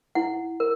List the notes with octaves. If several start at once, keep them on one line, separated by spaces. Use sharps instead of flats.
E4 F#5
A#4